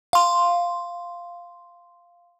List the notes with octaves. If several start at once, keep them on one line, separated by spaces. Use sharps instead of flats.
F5 C6